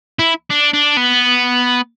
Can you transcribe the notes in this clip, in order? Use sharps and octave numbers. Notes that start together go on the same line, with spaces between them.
E4
D4
D4
B3